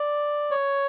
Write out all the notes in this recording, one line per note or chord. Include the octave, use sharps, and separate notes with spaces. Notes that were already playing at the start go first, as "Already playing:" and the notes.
Already playing: D5
C#5